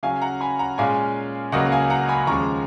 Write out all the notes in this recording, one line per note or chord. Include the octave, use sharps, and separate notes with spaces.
C#3 F#3 C#4 F5 G#5
F#5 A#5
G#5 B5
F#5 A#5
A#2 G#3 C#4 F5 G#5
C#2 C#3 F#3 A#3 D#5 F#5
F5 G#5
F#5 A#5
G#5 B5
D#2 C#3 F3 G#3 A#5 C#6